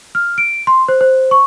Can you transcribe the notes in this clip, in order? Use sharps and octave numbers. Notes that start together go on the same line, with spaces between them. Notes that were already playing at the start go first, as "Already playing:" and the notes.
F6
D7
C6
C5
C5
C#6